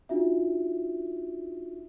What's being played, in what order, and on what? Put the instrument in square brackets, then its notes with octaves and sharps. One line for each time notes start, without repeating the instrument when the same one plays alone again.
[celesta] D4 D#4 F4 F#4 E5